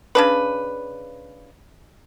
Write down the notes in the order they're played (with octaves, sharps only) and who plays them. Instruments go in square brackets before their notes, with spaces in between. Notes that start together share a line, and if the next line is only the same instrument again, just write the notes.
[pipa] C#3 D4 B4